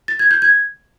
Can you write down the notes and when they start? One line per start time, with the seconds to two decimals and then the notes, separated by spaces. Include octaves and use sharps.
0.08 A6
0.19 G#6
0.31 G6
0.42 G#6